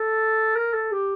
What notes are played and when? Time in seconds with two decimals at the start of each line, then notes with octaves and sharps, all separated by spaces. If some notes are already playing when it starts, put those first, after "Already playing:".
Already playing: A4
0.56 A#4
0.73 A4
0.92 G4